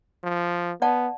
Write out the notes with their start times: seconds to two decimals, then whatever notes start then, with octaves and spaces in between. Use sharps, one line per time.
0.24 F3
0.82 B3 D5 F#5 A5